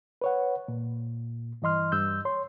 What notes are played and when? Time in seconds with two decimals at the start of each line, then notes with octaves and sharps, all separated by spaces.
0.22 B4 C#5 F#5
0.68 A#2
1.62 G2 E3 D#5 C6 F6
1.92 G2 E6 G6
2.25 C#5 C6